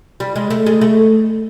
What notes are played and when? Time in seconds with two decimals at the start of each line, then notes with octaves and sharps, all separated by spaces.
0.20 G3
0.36 G#3
0.50 A3
0.66 G#3
0.81 A3